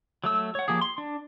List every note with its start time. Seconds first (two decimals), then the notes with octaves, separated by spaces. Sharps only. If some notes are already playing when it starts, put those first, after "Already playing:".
0.24 F#3 A3 E6
0.55 C#5 F#5
0.68 F3 A#3 G4 G#4
0.81 C6
0.98 D4